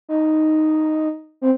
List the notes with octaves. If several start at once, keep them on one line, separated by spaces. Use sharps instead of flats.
D#4
C4